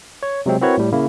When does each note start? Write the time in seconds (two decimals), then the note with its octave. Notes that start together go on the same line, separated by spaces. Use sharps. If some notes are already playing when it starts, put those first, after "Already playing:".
0.23 C#5
0.46 C3 F#3 G#3 C4
0.62 C4 E4 F#4 A#4 B4 C#5
0.78 A2 G3
0.92 C#3 A#3 E4